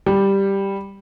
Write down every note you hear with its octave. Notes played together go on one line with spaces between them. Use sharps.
G3